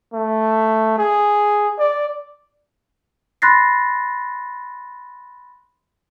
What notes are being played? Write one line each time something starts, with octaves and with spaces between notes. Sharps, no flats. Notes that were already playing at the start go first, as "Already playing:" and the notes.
A3
G#4
D5
B5 C6 F#6 A6 A#6 C7